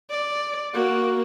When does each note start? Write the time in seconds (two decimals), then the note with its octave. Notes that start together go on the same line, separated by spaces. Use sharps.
0.10 D5
0.74 A#3 F#4